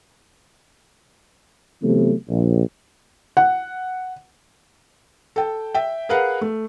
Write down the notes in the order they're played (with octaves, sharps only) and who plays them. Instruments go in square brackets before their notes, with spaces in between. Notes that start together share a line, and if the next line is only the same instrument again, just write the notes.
[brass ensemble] C3 E3 F#3 A3 B3 C4
A#1
[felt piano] F#5
A4 G5
E5 G5
G#4 A#4 B4 F5 F#5
A3